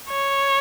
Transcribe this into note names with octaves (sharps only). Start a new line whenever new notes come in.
C#5